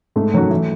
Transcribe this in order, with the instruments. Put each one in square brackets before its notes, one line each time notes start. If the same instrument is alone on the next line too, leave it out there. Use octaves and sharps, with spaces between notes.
[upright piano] G#2 [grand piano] A3
[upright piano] D#3 F#3 C#4 F#4
E3